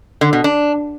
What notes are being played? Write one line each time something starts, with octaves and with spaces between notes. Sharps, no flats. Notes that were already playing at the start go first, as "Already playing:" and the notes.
D3
B2
D4